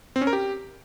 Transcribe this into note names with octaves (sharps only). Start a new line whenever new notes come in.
C4
C#4
A#4
G4